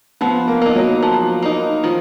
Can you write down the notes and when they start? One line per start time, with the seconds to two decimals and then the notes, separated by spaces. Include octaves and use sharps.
0.21 F3 B3
0.48 A#3
0.62 A#3 D#4
0.75 F#3
1.03 F3
1.43 A#3 D#4
1.83 D#3 F3